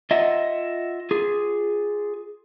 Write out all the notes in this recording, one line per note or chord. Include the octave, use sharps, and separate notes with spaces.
F4 D#5 E5 F#5
F4 G#4